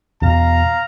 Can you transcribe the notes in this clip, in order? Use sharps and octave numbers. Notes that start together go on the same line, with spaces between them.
E2 B2 F5 A#5